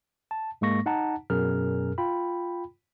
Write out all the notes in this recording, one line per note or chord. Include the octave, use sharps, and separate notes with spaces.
A5
G#2 G#3 A#3 C#6 A#6
D#4 F#5 A5 A#5
F#2 B2 G#4 A#4 F6
F4 G5 B5